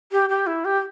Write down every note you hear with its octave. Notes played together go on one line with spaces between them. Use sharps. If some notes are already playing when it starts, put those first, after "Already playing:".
G4
G4
E4
G4